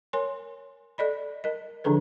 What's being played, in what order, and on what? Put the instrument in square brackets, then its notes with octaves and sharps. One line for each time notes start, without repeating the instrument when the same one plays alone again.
[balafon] A#4 C#5 G#5 C6
A4 D5 D#5 B5
A#4 D#5
D3 F3 D4 G#4 A4 B4